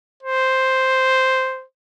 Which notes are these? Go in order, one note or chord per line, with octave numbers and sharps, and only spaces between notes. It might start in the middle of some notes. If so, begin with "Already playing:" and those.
C5